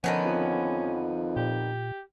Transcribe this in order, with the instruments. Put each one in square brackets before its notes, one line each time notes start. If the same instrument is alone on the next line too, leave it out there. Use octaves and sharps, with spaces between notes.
[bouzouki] D3 D#3 B3 [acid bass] F3 [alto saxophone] C#4
[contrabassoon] F2
[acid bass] A#2 [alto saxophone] G4